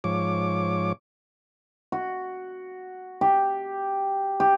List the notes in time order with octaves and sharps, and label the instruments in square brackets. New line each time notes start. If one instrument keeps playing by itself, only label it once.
[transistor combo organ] G#2 F3 C#5 D6
[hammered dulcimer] F#4
G4
G4